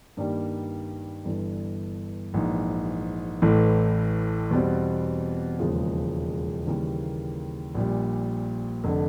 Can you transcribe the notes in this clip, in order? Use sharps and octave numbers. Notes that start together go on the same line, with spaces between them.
G2 D#3 G3 A#3
G1 G2 E3
A#1 G#2 E3
A1 A2 E3 A3
E2 B2 G3 C4
E1 D#2 C#3 F3 G#3
D#2 C#3 E3 G3 A#3
A#1 A#2 G3
F1 D3